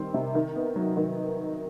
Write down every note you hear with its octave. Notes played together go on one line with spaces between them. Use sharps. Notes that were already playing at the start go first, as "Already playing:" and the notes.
Already playing: D#3 G3 C4
C3
D#3
B3
F#3
D#3